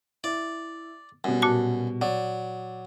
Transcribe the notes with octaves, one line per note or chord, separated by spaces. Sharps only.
E4 D5
F#2 B2 G3
A#2 F#4 A5
F#3 D5